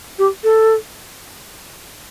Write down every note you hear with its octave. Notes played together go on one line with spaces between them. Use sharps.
G4
A4